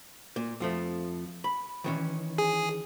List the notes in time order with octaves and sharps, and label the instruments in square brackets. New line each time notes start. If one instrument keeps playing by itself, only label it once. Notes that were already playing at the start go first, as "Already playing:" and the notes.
[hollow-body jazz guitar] A#2
F2 F3 A3
B5
D#3 E3 C#4
[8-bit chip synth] G#4